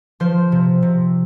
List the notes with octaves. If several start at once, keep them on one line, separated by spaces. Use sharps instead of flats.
F3 C5
C3
C3